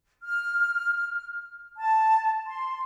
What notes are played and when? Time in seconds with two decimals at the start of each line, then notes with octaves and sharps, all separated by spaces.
0.24 F6
1.77 A5
2.47 C6